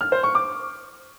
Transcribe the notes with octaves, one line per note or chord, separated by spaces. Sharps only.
F6
C5
C#6
D6